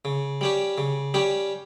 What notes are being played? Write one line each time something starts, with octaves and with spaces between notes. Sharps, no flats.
C#3
G3 C#4 G4
C#3
G3 C#4 G4